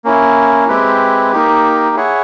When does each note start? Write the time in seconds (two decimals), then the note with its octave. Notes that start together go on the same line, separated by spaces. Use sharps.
0.05 A#3 C#4 E4
0.68 G#3 C4 E4 G4 B4
1.32 A#3 D#4 G4
1.96 E4 G#4 C#5 F#5